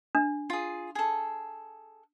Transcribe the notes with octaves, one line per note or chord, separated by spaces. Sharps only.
D4
F4 G#4
G#4 A4